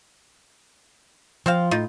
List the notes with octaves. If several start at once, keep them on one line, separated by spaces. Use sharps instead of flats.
F3 C4 C5 F5
A2 D#4 F4